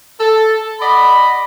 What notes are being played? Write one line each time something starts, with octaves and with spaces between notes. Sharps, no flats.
A4
D5 D#5 F#5 B5